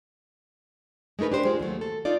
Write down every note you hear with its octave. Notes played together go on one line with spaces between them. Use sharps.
G#3 A3 D#4 A#4 B4
D4 G4 C5
G#3 F4
D#2 F#3 A3
A4
D#4 F4 D5